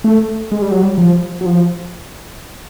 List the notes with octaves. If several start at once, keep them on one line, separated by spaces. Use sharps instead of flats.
A3
G#3
G3
F#3
G3
F3
F#3
F3